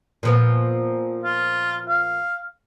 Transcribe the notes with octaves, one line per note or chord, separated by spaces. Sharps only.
A#2 F3 B3
F4
F5